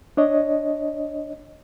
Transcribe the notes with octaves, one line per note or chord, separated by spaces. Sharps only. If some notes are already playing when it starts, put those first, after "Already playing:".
D4 C#5 D#5